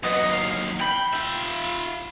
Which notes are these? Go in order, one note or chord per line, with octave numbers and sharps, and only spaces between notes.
D#2 F#3 B3 D#5 F#5
F5
G5 B5 G6
F4 E5